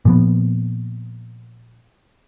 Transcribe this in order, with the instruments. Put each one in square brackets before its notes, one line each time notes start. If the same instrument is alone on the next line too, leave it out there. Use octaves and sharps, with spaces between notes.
[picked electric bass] A#2 F3 B3